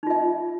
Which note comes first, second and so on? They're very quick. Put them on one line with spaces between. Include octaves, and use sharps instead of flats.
D#4 F4 E5